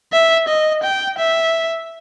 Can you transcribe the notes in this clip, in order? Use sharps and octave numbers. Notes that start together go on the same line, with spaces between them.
E5
D#5
G5
E5